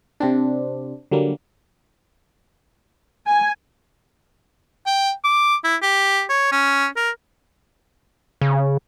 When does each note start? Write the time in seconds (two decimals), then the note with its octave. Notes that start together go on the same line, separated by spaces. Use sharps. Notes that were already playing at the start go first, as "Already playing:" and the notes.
0.20 C3 C4 D4
1.11 D3 F#3 G3 A#3
3.27 G#5
4.86 G5
5.24 D6
5.64 E4
5.82 G4
6.30 C#5
6.52 C#4
6.96 A#4
8.41 C#3